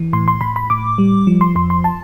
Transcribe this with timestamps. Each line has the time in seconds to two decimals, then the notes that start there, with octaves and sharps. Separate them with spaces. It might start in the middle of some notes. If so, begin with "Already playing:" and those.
Already playing: E3
0.13 A2 C6
0.28 C6
0.41 A2 B5
0.56 B5
0.70 A2 D6
0.98 G3
1.27 F3
1.41 C6
1.55 F2 C6
1.70 C6
1.84 A5